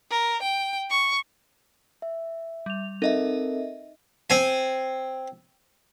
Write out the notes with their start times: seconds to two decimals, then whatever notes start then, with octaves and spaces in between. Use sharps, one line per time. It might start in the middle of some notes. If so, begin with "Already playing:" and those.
0.10 A#4
0.42 G5
0.90 C#6
2.02 E5
2.66 G3 F7
3.02 C4 D#4 A4 A#4 D#5 E5
4.30 C4 G#5